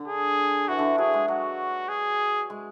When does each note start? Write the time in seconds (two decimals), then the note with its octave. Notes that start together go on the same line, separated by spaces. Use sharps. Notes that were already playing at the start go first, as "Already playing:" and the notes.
Already playing: D3
0.08 G#4
0.68 E3 F#4
0.79 D3
0.84 E3
0.98 F#3 G#4
1.14 G#3
1.28 F#3 F#4
1.89 G#4
2.50 G#3